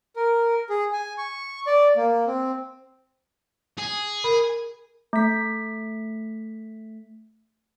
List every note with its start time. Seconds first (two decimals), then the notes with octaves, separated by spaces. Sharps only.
0.16 A#4
0.69 G#4
0.93 G#5
1.18 C#6
1.67 D5
1.96 A#3
2.27 C4
3.78 G#4
4.24 A#4 B5
5.13 A3 B6